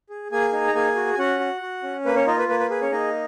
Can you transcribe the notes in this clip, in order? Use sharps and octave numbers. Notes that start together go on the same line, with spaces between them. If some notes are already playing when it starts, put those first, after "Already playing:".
G#4
A#3 G#4 G#5
D#4
A#5
A#3 G#4 G#5
F#4
G#5
C#4 F#4 F#5
F#4
F#4
C#4
A#3 B4
C#4 C#5
D#4 F4 D#5
B4
A#3 B4
B4
G#4 B4
C#4 C#5
A#3 D#4 D#5